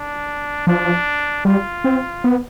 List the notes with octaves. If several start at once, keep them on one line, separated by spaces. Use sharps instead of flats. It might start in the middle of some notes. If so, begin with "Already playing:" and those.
Already playing: D4
F3 D4
G3 F4
C4
B3